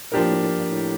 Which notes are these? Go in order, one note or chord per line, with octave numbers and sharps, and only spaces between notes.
A#2 F3 A#3 D4 G4 A#4
A2
A2
G2
A2